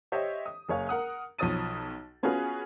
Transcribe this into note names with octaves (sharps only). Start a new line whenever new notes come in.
G4 C5 C#5 D#5 E5
D#6
F#1 G#4 C#5 F5
A#4 F#5 D#6
B1 F3 C#5 D#6 A6 D#7
B3 C#4 F4 F#4 G#4 B4